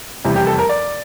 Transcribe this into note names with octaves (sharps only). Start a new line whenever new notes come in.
F1 E2 C3 G3 E4
G4
A4
A#4
D5